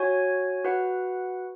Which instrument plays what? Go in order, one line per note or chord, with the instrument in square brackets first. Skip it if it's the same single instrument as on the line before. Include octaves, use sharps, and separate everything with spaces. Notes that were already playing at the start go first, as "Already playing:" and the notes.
Already playing: [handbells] F#4 C#5 G#5
F#4 B4 F#5